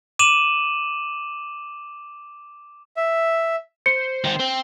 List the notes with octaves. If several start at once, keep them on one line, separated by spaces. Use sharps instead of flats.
D6 D#7 E7 F#7
E5
C5 C#7
D#3 C4
C4